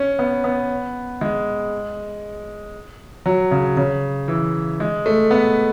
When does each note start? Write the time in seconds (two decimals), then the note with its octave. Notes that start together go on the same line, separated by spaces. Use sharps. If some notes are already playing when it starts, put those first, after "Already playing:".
Already playing: C#4
0.19 B3
0.44 B3
1.21 G#3
3.26 F#3
3.51 C#3
3.77 C#3
4.28 E3
4.80 G#3
5.06 A3
5.31 B3